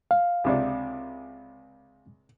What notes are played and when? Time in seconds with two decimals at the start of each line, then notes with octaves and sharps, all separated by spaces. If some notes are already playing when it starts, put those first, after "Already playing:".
0.11 F5
0.44 C#2 C3 D4